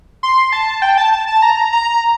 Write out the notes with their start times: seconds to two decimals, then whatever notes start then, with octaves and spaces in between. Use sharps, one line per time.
0.23 C6
0.52 A5
0.82 G5
0.98 A5
1.13 A5
1.28 A5
1.42 A#5
1.73 A#5